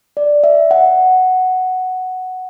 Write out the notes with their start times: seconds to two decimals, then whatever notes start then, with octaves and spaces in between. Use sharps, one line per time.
0.17 D5
0.44 E5
0.71 F#5